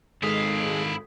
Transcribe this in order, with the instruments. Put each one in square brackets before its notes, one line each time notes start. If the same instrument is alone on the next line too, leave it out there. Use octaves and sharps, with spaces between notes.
[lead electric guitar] G#2 D#3 [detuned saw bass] G#3 [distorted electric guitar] E4 F5 [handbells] A4 D#6 B6